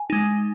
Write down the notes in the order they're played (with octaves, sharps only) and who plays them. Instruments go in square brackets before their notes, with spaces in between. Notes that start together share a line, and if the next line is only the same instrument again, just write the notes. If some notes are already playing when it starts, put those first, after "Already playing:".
Already playing: [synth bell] G#5
G#3 D#4